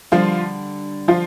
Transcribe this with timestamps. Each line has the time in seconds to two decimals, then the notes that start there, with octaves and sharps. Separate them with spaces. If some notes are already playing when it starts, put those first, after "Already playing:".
0.12 D3 F3 G3 D4 F4 A4 D5
1.08 F3 F4